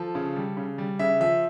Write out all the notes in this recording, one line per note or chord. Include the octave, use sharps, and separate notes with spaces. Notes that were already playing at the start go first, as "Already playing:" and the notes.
Already playing: F3 A4
C#3
G3
C#3
G3
C#3 E5
F3 E5